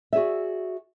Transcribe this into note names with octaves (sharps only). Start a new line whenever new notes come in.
F#4 G#4 D5 E5